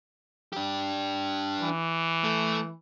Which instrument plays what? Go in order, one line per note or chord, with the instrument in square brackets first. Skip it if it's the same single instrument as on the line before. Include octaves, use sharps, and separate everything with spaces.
[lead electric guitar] D4 G4
[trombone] E3
[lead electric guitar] A3